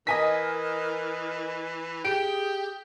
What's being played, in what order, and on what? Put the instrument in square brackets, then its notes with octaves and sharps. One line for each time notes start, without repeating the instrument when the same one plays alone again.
[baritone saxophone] E3 [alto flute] A#4 [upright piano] D#5 G#5 B6
[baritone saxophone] G4 [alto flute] G#4 [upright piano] D7